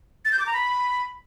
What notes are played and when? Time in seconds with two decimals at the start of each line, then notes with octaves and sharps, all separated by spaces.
0.25 A6
0.32 G6
0.39 D6
0.46 A#5
0.53 B5